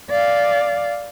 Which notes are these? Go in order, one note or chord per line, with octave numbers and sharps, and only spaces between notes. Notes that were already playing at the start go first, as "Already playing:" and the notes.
D5 F5